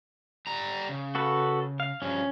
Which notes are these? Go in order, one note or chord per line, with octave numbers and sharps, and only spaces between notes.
G3 A#5
C#3
F#4 A4 B4
F5
G2 F3 C#4